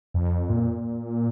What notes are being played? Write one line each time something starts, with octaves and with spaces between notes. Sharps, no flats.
F2
A#2